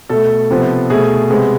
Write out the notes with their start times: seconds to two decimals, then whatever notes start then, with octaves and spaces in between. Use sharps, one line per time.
0.09 B2 A3 A4
0.50 C3 F3 B3
0.90 B2 A3 G#4
1.30 C3 G#3 B3